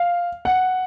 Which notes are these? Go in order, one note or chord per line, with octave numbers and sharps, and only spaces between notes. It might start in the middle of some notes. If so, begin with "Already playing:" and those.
Already playing: F5
F#5